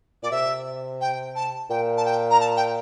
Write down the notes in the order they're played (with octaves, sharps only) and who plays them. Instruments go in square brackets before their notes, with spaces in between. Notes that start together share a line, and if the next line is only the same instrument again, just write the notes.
[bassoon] A#2 [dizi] D5
[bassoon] C3 [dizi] E5
[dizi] G5
A5
[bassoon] A#2 [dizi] G5
[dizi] A5
G5
A#5
A5
G5